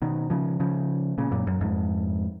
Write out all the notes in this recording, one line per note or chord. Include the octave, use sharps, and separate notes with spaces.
B2 D#3
C#3 F3
C#3 F3
A#2 C#3
F#2 A#2
F#2
F2 G#2